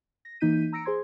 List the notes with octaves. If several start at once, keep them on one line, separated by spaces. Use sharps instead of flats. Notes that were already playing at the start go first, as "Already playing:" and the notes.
A#6
E3 A#3 D#4 G6 B6 D#7
A#5 E6 A#6 C#7 D7
G#4 C5 C6 G#6